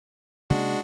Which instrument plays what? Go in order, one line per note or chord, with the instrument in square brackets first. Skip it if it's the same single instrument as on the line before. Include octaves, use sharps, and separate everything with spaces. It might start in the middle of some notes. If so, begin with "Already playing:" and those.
[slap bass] C3 A#3 C#4 [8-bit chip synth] G#3 D4 F#4